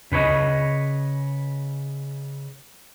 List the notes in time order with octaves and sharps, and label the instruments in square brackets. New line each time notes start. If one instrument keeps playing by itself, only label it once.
[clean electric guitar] C#3 B4 C#5 D#5